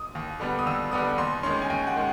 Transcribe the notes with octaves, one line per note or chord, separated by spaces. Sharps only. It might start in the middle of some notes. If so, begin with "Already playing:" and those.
Already playing: D#6
D#2
D3 G3 B3
D#6
D#2 E6
D3 G3 B3 D#6
D#2 C6
D#3 G#3 C#4 C6
G#5
D#2 G5
F#5
D#3 G#3